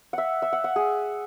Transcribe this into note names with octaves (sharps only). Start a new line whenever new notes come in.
E5 F#5
E5
F#5
F#5
G#4